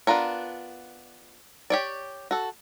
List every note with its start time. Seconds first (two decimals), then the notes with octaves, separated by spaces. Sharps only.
0.07 B3 D4 F4 A#4 C#5
1.70 G4 C#5 D5
2.31 F#4 A4